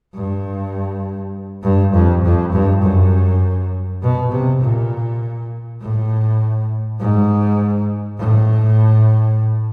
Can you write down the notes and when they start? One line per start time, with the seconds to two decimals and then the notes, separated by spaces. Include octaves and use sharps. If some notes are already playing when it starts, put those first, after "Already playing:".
0.14 G2
1.63 G2
1.93 F2
2.24 F2
2.52 G2
2.82 F#2
4.02 B2
4.31 C3
4.61 A#2
5.81 A2
7.00 G#2
8.18 A2